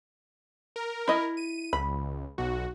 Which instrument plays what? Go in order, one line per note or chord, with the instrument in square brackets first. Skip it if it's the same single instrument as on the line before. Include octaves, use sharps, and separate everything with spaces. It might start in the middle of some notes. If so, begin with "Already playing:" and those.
[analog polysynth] A#4
[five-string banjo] E4 D#5
[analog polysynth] D#7
[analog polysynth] C#2 [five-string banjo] B5
[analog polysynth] B1 F#4